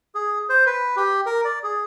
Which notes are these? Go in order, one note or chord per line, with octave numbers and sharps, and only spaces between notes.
G#4
C5
B4
G4
A#4
D5
G#4